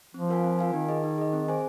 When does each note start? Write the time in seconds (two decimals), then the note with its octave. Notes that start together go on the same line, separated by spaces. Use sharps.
0.14 F3 C4
0.29 F4 A#4 F5 G#5
0.44 C4
0.59 F4 A#4 F5 G#5
0.74 D#3 D#4
0.89 G#4 D#5
1.04 D#4
1.18 G#4 D#5
1.33 C4
1.48 G#4 C5 G#5